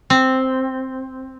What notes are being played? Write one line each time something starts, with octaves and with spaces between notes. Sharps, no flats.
C4